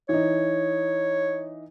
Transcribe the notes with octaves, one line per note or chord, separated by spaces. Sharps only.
E3 D#4 C#5